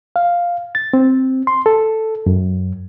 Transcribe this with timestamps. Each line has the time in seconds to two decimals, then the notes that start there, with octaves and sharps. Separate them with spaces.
0.16 F5
0.75 A6
0.94 C4
1.47 C6
1.66 A4
2.26 F#2